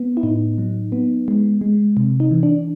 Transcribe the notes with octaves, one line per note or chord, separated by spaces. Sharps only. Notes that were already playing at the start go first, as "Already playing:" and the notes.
Already playing: B3
E4
A2 D#4
F#3
B3
G#3
G#3
C3
D#4
E3
D4